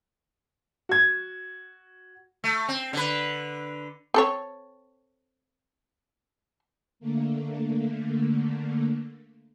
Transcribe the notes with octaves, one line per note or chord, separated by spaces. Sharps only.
F#4 G#6
A3
C4
D3 B4
C4 A4 C#5
D3 A3 A#3